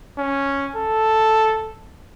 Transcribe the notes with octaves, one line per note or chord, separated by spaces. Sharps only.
C#4
A4